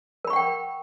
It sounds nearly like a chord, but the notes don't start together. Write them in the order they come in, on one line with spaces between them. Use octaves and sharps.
A#4 B5 C#6 F#5 G5